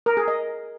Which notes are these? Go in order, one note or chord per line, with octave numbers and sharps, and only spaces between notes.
A#4
G#4
D#5